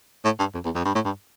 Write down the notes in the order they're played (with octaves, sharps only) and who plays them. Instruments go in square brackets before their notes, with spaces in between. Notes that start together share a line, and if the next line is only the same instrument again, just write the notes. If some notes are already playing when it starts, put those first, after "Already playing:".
[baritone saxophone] A2
G2
F2
E2
F2
G2
A2
G2